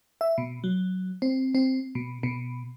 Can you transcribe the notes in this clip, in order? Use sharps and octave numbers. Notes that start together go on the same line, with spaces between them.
E5
B2
F#3
C4
C4
B2
B2